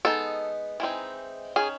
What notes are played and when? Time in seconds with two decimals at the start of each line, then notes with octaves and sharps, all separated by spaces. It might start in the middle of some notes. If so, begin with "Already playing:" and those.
0.05 G#3 B3 D#4 A4
0.80 E3 G#3 C4 D#4
1.56 D#3 G#3 C#4 G#4